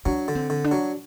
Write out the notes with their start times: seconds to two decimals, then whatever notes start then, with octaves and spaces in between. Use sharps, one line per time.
0.06 F#3 D4
0.28 D3
0.35 C4
0.50 D3
0.64 D4
0.71 F#3